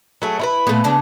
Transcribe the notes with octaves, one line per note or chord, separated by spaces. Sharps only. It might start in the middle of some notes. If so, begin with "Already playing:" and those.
F#3 A3 G#4
E4 F4 B4
A#2 A3 B3
C#3 D4